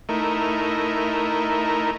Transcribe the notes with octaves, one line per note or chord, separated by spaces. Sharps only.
A3 D#4 E4 A#4